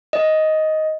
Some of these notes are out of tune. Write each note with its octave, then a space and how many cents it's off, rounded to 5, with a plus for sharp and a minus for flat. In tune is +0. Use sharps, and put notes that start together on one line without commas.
D#5 +10